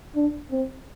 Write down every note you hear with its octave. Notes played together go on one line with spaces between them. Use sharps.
D4
C4